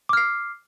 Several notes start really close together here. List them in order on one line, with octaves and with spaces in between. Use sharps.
D6 F6 C7